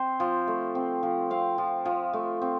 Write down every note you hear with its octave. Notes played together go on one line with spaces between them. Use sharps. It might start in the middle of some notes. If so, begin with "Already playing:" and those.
Already playing: C4 C5
F3
A3
C4
F3
C4 F5
F3
F3
A3
C4